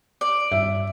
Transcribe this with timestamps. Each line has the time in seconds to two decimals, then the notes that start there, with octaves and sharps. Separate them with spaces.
0.21 D5
0.52 G2 E5